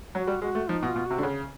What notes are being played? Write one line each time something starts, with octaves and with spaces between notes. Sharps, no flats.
F#3 F#4
G3
G#3 F#4
A3
F3 D#4
B2
F4
B2
C3 F#4
D3
C#3